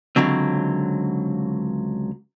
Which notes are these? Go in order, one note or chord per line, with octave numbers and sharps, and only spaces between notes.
C#2 D3 F#3 C4